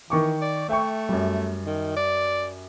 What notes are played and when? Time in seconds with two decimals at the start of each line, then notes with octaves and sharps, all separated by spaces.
0.10 D#3 E3 C#6 D6
0.41 D5
0.69 A3 E5 G5 C#6
1.09 F#2 G3
1.65 D#3
1.96 D5